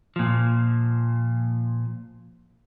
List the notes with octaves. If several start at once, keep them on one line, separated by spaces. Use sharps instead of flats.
A#2 F3